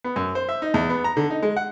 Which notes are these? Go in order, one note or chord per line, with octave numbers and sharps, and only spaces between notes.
B3
F#2
C5
E5
D#4
E2
B3
A#5
D3
D#4
G#3
F#5